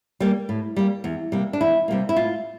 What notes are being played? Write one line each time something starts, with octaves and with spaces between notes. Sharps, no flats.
G3 A#3
A2
G3 A#3
E2
C3 G3 A#3
D4
E2 E4
C3 G3 A#3
E4
A2 F4